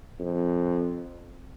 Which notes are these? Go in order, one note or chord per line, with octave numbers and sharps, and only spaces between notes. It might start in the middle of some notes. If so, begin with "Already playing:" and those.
F2